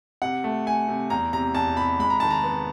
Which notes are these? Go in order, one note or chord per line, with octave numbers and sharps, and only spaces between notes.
C3 F#5
A3
A3 G#5
C3
E2 A#5
C3 A#5
E2 A5
C3 B5
G#3 B5
A#5
D#3 A5
A#5
B3